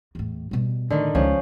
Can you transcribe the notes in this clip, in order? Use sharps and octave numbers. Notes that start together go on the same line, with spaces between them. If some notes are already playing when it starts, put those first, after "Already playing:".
E2 A2
B2 G3
A2 D3 D#3
C#2 F3 C#4